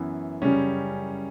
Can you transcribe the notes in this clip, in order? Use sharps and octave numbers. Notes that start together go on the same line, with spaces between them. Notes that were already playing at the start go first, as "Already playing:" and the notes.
Already playing: F#2 E3 B3 E4
F#2 C#3 G3 C#4